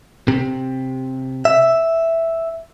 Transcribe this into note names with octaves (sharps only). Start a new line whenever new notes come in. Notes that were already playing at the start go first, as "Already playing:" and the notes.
C3
E5